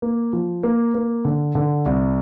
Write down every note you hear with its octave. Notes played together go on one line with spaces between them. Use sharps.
A#3
F3
A#3
A#3
D3
D3
C2